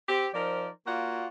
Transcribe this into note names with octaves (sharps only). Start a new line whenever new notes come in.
C4 G4
F3 D#4 A#4 C5 D5
A#3 F4 F#4 D5 F#5